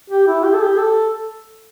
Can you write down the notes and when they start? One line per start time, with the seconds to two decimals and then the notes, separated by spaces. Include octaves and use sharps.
0.10 G4
0.27 E4
0.44 G4
0.54 A4
0.64 G4
0.78 A4